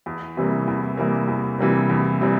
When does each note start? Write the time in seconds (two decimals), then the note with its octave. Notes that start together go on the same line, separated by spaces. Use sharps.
0.06 E2
0.37 C3 E3 G3 A#3
0.67 E2
0.97 C3 E3 G3 A#3
1.28 E2
1.59 C3 E3 G3 A#3
1.89 E2
2.21 C3 E3 G3